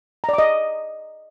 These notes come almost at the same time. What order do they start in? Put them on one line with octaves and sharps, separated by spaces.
A#5 D5 D6 D#5